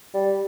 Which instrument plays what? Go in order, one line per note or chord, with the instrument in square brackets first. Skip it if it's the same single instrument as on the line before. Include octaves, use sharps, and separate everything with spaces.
[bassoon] G3